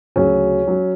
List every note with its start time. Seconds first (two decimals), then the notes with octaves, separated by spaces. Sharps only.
0.16 D2 C#3 F#3 C#4
0.68 F#3